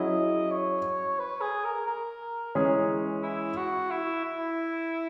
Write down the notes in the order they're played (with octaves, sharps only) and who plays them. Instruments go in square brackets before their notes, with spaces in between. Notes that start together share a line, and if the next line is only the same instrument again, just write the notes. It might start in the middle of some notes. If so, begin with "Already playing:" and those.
Already playing: [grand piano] F#3 C#4 E4 G#4 [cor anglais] D#5
[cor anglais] C#5
B4
G#4
A#4
A#4
[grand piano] E3 G#3 C#4 G#4 C#5
[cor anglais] E4
F#4
E4
E4